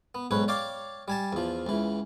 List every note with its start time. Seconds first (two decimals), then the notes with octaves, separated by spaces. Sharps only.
0.15 B3
0.31 B1 G#2 B4 C#5
0.48 C#5 D5 F5 G5 D6
1.08 G3 G#5 A5
1.33 E2 F3
1.66 C#2 E3